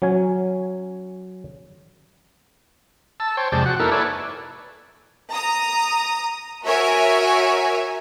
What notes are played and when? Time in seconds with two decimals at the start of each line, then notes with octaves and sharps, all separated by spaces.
0.02 F#3 C#4 G#5
3.20 A5 E6
3.37 C5 C#5 G5
3.52 F2 C3 G#3 D5 G5 A5
3.66 F#4 F#5
3.79 A#3 D#4 E4 A4 A#4
3.92 A4 B4 C#5 D5 E5 G#5
5.33 A#5 D#6
6.64 F#4 A#4 C#5 E5 G#5